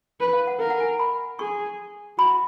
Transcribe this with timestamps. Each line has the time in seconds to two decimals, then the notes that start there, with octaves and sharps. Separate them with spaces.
0.20 B4
0.33 F5
0.47 F#5
0.60 A#4 F5
0.70 F#5
0.80 G#5
0.99 B5
1.39 G#4 C#6
2.18 F#4 B5